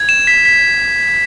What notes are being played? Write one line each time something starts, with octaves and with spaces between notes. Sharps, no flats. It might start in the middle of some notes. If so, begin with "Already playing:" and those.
Already playing: G#6
E7
B6
B6